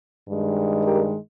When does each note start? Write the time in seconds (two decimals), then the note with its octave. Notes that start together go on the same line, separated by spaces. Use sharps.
0.28 G2 D#3 G#3
0.82 G4 A#4